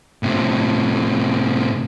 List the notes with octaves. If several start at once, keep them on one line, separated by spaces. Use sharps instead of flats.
A2 C3